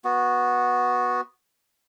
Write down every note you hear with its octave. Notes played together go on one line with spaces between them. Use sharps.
B3 F#4